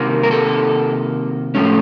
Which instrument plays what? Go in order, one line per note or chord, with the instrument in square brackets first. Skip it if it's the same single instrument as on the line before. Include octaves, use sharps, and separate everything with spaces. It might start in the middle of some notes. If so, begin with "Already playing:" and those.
Already playing: [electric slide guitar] C3 D#3 A#3
A#4
A4
A2 F3 A3 C#4